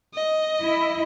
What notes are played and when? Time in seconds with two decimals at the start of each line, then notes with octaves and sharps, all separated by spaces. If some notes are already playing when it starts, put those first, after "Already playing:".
0.14 D#5
0.63 E4